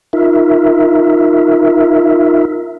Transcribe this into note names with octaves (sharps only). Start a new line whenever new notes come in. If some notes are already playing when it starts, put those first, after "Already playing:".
D#4 F4 A#4 E5